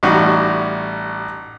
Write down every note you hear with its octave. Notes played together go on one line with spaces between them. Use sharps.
A1 G3 D#4 F#4